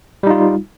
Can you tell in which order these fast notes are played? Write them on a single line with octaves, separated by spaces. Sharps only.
G3 D#4 F4